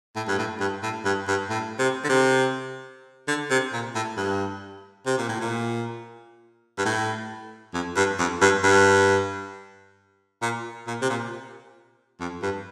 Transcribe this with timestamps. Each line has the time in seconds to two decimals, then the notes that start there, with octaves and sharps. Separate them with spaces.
0.15 A2
0.28 G2
0.38 A2
0.60 G2
0.83 A2
1.05 G2
1.28 G2
1.49 A2
1.79 C3
2.04 D3
2.09 C3
3.28 D3
3.50 C3
3.73 A#2
3.95 A2
4.17 G2
5.06 C3
5.18 A#2
5.29 A2
5.40 A#2
6.78 G2
6.85 A2
7.74 F2
7.96 G2
8.19 F2
8.41 G2
8.63 G2
10.42 A#2
10.87 A#2
11.01 C3
11.09 A#2
12.20 F2
12.42 G2